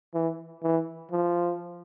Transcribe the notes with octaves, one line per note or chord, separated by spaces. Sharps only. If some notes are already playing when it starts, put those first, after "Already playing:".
E3
E3
F3